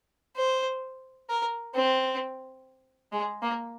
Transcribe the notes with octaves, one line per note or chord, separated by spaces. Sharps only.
C5
A#4
C4
G#3
A#3